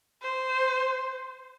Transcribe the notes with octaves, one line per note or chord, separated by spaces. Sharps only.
C5